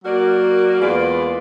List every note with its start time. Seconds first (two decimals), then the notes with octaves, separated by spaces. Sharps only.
0.04 F#3 A#3 F#4 A#4 D5
0.80 E2 G#3 A#3 F4 B4 D5